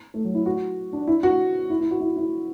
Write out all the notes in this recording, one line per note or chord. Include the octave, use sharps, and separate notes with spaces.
A3
F#3
E4
F#4
D4
E4
F#4
E4
E4
F#4
E4
E4